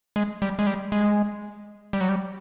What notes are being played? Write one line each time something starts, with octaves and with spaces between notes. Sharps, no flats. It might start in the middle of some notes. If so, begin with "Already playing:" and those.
G#3
G3
G#3
G3
G#3
G3
F#3
G3